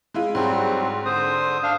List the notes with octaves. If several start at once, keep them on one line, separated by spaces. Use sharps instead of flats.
G#3 E4 F4
G#2 F#3 G3 C4
D3 C5 D#6
D4 F5